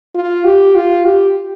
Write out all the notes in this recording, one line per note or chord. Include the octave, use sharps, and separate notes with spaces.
F4
G4
F4
G4